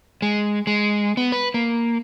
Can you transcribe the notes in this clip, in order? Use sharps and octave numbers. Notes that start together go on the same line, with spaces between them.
G#3
G#3
B3
B4
A#3